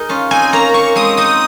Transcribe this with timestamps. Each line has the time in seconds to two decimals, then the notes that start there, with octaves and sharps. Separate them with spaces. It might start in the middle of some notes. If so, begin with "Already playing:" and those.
Already playing: D#4 G#4 A#4
0.09 C#4 F4
0.31 C4 D#4 G#5
0.53 A#3 C#4 A#5
0.74 A#3 C#6
0.96 G#3 C4 D#6
1.17 C4 D#4 D#6